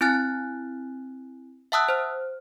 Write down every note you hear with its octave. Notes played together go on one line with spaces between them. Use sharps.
C4 E4 G#5 F6 F#6 A6
E5 F#5 A5 D#6 E6 F#6
C5 F6